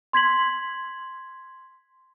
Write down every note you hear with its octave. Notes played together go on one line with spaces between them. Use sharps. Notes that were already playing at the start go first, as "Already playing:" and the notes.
C6 G#6 B6 F#7